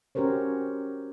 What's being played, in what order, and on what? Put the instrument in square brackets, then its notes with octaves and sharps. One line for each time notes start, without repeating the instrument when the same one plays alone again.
[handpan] C#4 F#4 G4 A#4 C5 C#5